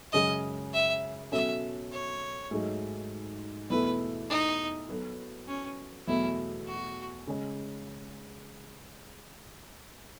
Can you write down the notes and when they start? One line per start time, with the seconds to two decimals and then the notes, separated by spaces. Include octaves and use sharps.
0.13 F#2 C#3 G#3 C#4 G#4 D#5
0.73 E5
1.32 B2 F#3 C#4 F#4 A4 E5
1.92 C#5
2.51 G#2 F#3 A3 D#4 G#4
3.70 E2 B2 A3 E4 A4 B4
4.30 D#4
4.89 F#3 B3 F#4 A4
5.48 C#4
6.08 E2 B2 F#3 A3 E4
6.67 F#4
7.27 C#3 G#3 C#4